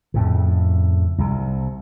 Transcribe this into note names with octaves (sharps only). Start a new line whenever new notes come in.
F2 A2 C#3
C2 C3